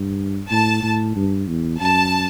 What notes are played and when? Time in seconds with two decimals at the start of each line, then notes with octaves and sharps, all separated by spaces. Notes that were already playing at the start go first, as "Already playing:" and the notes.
Already playing: G2
0.49 A2 A5
0.82 A2
1.15 G2
1.48 E2
1.80 F#2 A5